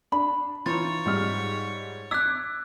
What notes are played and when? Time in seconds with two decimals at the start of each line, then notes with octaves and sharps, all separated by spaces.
0.12 D4 B5
0.66 E3 D#4 F4 C#5 A6
1.06 G#2 G3 F6
2.11 D6 E6 F#6 G#6 B6